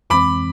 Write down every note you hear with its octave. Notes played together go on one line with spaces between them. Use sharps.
F2 E3 G#3 C4 B5 D6